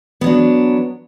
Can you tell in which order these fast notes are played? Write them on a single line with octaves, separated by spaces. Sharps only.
B3 F#3 D4